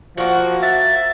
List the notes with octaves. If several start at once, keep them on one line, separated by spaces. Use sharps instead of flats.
F3 A#3 F#4
E5 A6